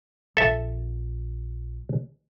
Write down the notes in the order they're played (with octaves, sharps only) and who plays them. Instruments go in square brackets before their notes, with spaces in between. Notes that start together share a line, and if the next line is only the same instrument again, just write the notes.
[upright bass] A#1 [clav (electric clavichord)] A4 E5